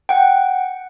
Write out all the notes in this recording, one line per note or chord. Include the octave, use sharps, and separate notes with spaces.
F#5 G5